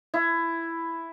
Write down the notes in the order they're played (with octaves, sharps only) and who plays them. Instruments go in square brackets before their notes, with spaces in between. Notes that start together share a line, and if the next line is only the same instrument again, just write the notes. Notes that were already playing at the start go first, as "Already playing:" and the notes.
[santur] E4